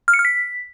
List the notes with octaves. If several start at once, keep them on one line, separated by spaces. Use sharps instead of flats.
F6
C#7
F6
B6